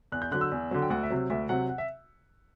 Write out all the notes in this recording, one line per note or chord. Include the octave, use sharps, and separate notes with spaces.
E2 F#6
G6
D3 F#3 F#6
E6
E2
D3 F#3
G5
D2 F#5
E5
C3 F#3
D2 E5
C3 F#3 F#5
F#5
E5